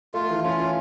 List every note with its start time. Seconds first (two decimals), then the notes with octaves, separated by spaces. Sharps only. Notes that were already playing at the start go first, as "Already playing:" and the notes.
0.14 A3 F4
0.30 E3
0.44 C#4 F4